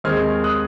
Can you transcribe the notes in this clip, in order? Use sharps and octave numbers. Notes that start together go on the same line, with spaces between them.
D#2 D#3 G#3 C4 F6 G#6
D#6 F#6